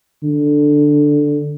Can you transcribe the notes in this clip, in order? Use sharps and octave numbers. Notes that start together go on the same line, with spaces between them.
D3